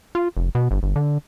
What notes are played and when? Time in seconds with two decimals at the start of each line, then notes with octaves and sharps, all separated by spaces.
0.15 F4
0.37 F1
0.55 B2
0.71 G1
0.83 G1
0.96 D3